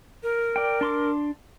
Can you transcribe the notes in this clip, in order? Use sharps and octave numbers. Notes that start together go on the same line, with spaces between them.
A#4
D5 G5
D4 C6 D6